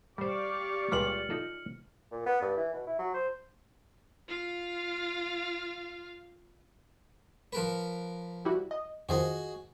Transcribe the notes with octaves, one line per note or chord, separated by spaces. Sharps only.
G3 G4 C5 D5 F5 C#6
C#2 A#2 G3 F6 C#7 F#7
D#4 F4 A4
A#2
B3
G2
E3
B2
E4
F#3
C5
F4 F5
F3 A#4 B4
G3 E4 F#4
D#5
F2 D#3 F3 F#4 G#4 D#5